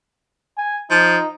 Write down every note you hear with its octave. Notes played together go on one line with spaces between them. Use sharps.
G#5
F3 D#4